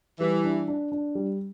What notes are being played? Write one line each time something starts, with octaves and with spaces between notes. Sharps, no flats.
E3 G3
D4
D4
D4
G3